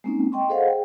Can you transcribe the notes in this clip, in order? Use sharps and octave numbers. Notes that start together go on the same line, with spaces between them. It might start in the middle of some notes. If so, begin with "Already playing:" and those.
G#3 A#3 C4 C#4 D#4
D#5 G5 C6 C#6
G#4 A4 C5 D#5 F5 F#5
G#4 G5